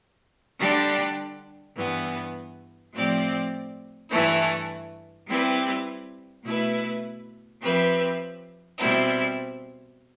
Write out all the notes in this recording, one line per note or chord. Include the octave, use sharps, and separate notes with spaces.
D3 G3 D4 G4 D5
G2 E3 B3
A2 F3 C4 G4 D5
G2 E3 A3 E4
G3 C4 E4 G4 B4
B2 A3 E4 B4 E5
F3 C4 G4 B4 E5
B2 G3 C4 E4